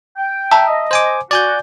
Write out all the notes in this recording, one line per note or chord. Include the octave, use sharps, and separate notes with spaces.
G5
E5 A5 A#5
D#5
C5 G#5 D6
F#4 D5 G#5 G6